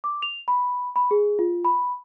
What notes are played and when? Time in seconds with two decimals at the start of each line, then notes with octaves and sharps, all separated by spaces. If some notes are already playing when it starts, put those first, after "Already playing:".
0.04 D6
0.22 F7
0.48 B5
0.96 B5
1.11 G#4
1.39 F4
1.65 B5